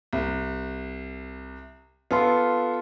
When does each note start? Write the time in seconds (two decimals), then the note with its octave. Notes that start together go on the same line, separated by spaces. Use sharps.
0.13 C2
2.11 B3 F4 A4 C6